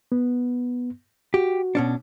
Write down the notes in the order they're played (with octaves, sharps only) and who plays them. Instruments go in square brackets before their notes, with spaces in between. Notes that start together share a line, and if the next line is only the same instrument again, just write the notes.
[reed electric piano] B3
[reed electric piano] F#4 [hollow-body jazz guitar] G4
[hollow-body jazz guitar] B2 C#4 D4